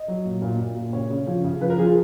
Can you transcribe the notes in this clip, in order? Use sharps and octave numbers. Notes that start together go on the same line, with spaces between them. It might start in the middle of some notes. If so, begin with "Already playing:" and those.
Already playing: D#5
F#3
A#2
A#2
A#2
A#2
C#3 C#5
C#3
F3
C#3
F3 B4
A#4
F3 G#4
F4